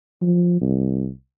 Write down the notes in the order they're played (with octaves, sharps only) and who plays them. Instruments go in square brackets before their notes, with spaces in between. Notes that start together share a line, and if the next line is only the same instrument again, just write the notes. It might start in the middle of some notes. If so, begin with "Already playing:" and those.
[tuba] F3
C2